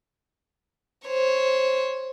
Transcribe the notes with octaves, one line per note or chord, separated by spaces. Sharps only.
C5 C#5